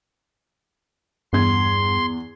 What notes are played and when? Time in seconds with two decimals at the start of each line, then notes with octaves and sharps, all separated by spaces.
1.33 E2 G2 C6 G#6